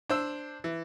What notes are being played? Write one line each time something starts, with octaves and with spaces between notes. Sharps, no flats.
D4 C5 E6
E3